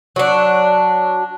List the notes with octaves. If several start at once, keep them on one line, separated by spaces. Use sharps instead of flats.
F#3 D4